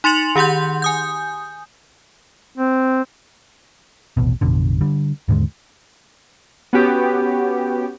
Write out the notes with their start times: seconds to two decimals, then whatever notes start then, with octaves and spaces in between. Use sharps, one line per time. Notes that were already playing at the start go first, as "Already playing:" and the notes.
0.04 D#4 C6 A6 C#7 F7 F#7
0.35 D#3 G4 F#5 C6 G6
0.82 G#5 D#6 G6
2.58 C4
4.17 D#1 A1 B2
4.41 A1 F2 B2 D3
4.81 D3 G3
5.28 D#2 G#2 D3 G#3
6.73 B3 C#4 F#4 G4